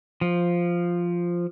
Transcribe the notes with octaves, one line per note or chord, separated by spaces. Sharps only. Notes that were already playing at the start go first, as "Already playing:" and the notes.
F3